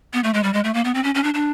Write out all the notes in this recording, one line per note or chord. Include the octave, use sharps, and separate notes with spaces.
B3
A3
G#3
G3
G#3
A3
A#3
B3
C4
C#4
C#4
D4
D4